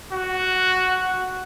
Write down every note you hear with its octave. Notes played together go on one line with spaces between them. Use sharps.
F#4